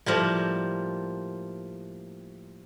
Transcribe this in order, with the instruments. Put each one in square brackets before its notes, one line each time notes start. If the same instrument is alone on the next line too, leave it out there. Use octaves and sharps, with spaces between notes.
[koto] A2 F3 G3 A#3